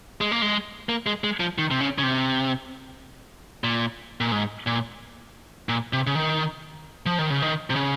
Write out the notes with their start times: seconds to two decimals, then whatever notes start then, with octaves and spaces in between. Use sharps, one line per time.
0.21 G#3
0.32 A#3
0.42 G#3
0.89 A#3
1.06 G#3
1.24 G#3
1.40 F3
1.58 D#3
1.71 C3
1.81 C#3
1.98 C#3
2.03 C3
3.64 A#2
4.21 A#2
4.32 G#2
4.67 A#2
5.69 A#2
5.93 C3
6.07 C#3
6.15 D#3
7.06 F3
7.19 D#3
7.30 C#3
7.42 D#3
7.70 C3
7.76 C#3